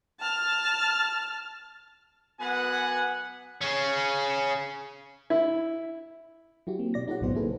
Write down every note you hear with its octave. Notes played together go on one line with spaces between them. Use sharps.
A5 F6
F#2 B3 B4 F#5 G#5
C#3 C#4
E4
F#3 E4 F#4 G4
A#3 C4
B2 D5 A#6
D#4 F4 G4 A4 C#5 F#5
B1 F#2 A2 F#3 B3 C5
C#3 A#3 E4 G#4 A4 B4